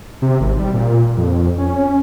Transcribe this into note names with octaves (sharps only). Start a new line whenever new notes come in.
C3
G#1
G3
A#2
F2
C#4